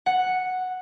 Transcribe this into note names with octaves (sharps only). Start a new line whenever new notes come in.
F#5